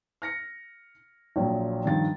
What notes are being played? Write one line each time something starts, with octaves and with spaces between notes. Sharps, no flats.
F6 A#6 C#7
A#1 A#2 F3 F#3
G2 D#3 F3 A6